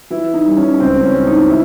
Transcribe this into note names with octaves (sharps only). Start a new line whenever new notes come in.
E3 E4
D#4
G3
C#4
C#2 C4
C#4
E3
D#4
E4